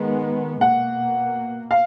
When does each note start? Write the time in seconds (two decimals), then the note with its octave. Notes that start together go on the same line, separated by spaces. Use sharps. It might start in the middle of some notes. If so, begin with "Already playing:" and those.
Already playing: D#3 G#3 B3
0.61 B2 A#3 F#5
1.71 F5